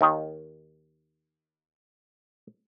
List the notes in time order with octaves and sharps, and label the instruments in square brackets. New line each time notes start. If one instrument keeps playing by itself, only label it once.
[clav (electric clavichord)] D#2 D#3